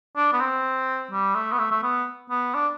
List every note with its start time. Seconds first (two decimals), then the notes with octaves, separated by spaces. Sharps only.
0.16 D4
0.33 B3
0.40 C4
1.11 G3
1.35 A3
1.52 B3
1.59 A3
1.71 A3
1.83 B3
2.30 B3
2.55 D4